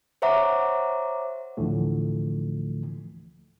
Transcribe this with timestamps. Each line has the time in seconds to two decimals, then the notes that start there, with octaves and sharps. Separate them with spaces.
0.22 C5 C#5 E5 F#5 A#5 D6
1.57 D2 A2 D3 E3 F3 A3